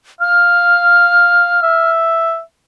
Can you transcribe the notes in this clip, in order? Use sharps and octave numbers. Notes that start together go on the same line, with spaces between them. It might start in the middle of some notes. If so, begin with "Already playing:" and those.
F5 F6
E5